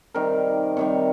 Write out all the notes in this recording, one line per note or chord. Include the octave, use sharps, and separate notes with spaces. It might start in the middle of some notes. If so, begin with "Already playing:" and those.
C3 D#3 G3 A#4
C3 D#3 G3 C#5